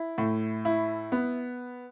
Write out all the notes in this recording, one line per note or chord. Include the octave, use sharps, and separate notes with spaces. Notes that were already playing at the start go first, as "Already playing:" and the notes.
Already playing: E4
A2
E4
B3